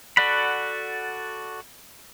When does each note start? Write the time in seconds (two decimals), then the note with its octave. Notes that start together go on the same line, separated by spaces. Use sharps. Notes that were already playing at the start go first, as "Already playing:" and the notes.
0.17 F#4 A4 D5 F#5 B5